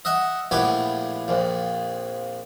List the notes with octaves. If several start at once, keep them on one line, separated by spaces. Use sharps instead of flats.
D#5 E5 F#5
A#1 A2 B3 G4 G#5
A#1 F2